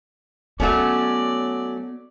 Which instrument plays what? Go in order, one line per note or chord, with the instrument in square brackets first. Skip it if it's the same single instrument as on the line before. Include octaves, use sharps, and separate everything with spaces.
[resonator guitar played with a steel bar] F#3 A3 C#4 [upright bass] B3 [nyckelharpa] D5